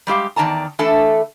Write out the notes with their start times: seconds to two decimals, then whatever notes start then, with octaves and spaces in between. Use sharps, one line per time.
0.07 G3 G#3 G4 F5
0.36 E2 D#3 D5 A5 A#5
0.79 E3 A3 D4 A4 A5